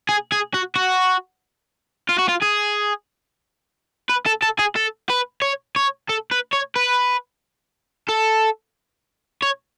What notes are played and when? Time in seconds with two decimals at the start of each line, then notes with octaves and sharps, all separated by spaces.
0.09 G#4
0.32 G#4
0.54 F#4
0.76 F#4
2.09 F4
2.19 F#4
2.29 F4
2.42 G#4
4.09 B4
4.26 A4
4.42 A4
4.59 G#4
4.76 A4
5.09 B4
5.42 C#5
5.76 C#5
6.09 A4
6.31 B4
6.53 C#5
6.76 B4
8.09 A4
9.43 C#5